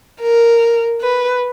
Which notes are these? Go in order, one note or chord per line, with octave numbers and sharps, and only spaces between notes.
A#4
B4